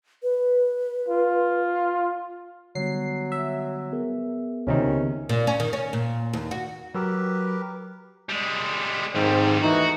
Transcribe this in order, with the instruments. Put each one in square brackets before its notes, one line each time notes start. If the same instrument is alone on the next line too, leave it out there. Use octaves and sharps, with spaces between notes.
[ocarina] B4
[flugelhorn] F4
[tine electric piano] D3 G3 B3 [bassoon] F#3 [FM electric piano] C7
[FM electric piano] E5
[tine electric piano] B3 G#4 A#4
[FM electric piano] C#2 C3 D#3 [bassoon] C#4
[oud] A#2
C#4
D#3
C#4
A#2
D#2
F#4
[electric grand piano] F#3 E6 [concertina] G4 A#4 B4
[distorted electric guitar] G3 G#3
[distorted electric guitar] F2 G3 [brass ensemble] G#2 D#3 [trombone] C4
[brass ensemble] D#2 A2 E3 [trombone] D#4 [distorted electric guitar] F#4